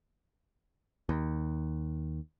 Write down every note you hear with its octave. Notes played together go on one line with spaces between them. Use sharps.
D#2